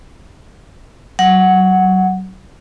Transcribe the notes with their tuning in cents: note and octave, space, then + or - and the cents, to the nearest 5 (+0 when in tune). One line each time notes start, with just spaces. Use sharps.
F#3 +30 F#5 +0